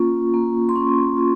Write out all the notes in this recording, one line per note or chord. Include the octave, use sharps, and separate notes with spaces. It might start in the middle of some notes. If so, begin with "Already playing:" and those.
Already playing: A#3 C#4 F4 C#6
A#3
C6
C#4 C#6
F4